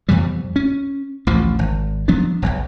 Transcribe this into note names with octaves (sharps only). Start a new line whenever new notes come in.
F2 B2 E3 G3
C#4
A1 D2 F3
G#1
F3 F#3 B3 D4
E1 B1